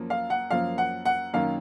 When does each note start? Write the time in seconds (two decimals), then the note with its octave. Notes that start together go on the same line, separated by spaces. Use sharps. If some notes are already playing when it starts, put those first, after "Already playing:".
Already playing: F#2 F3 A#3
0.10 F5
0.30 F#5
0.51 F#2 F3 A#3 F5
0.78 F#5
1.05 F#5
1.33 F#2 D#3 A#3 F5